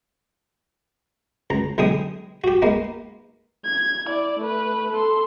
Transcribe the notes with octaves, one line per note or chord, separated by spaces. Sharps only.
C#2 A#5
B1 D3 G#3 G#4 G5 D#6
F#4 G4
G#3 A#3 B3 D#4
G#6
E4 D5
A3 B4
A4 C6